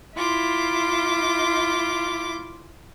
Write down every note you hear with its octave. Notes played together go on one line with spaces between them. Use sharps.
E4 F4 C6 D6